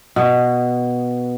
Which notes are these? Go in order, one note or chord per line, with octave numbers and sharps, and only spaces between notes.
B2